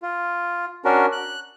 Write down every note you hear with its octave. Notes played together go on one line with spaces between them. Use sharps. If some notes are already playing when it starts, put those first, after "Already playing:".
F4
C#4 D4 F#4 A#4
F#6